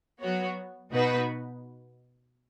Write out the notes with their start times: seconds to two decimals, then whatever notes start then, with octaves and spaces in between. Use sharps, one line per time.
0.21 F#3 B3 F#4 C#5
0.91 B2 B3 D#4 F#4 B4